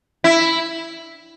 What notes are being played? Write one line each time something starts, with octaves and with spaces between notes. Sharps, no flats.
E4